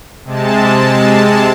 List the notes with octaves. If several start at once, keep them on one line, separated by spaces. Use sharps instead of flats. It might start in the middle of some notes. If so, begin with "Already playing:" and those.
C3 G#3 A5